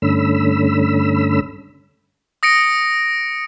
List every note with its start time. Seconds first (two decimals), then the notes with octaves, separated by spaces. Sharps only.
0.02 G2 D3 A3 C#4 B5 E6
2.43 D#6 A#6 C#7 D7